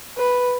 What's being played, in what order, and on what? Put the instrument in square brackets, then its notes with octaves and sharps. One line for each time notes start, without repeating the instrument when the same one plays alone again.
[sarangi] B4